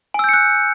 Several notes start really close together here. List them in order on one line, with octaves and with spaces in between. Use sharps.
G#5 E6 G6 C#7 F#6